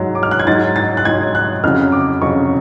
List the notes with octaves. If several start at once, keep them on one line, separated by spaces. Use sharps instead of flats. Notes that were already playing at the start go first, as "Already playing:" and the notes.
Already playing: G#2 F#3
D6
F6
F#6
G#6
G#2 F#3 A6
A6
F#6
G#2 F#3 G#6
F#6
F2 C#3 F#3 F6
D6
F2 C#3 F#3 C#6